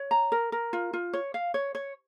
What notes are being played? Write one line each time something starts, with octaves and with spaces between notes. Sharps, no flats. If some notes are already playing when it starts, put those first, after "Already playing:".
Already playing: C#5
A#5
A#4
A#4
F4
F4
C#5
F5
C#5
C#5